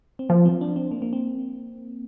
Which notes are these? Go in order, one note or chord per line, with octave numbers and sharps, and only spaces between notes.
C4
F3 A#3
C4
D4
C4
A#3
A#3
C4